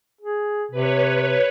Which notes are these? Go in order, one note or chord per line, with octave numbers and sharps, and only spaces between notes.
G#4
C3 B4 C#5